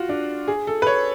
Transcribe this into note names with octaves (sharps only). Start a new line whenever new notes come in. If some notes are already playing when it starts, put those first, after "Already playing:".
Already playing: F4 F#4
D4
G#4
A4
B4
C#5